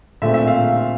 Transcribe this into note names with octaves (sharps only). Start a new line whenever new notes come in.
A#2 A3 C4 E5
E5
F5